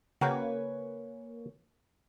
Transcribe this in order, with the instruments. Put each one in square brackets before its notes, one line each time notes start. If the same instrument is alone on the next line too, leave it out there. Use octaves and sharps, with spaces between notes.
[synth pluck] C#3 [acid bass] A#3 [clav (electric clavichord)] F#4 A#4 G5 [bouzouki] B4 C#5 G#5